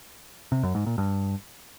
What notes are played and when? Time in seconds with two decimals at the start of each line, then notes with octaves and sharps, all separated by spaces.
0.52 C3
0.63 F#2
0.75 G#2
0.86 A#2
0.98 G2